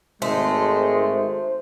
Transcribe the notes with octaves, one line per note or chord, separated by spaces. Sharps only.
G#1 G#3 A3 C5